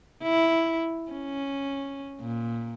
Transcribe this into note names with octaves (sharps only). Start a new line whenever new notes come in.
E4
C#4
A#2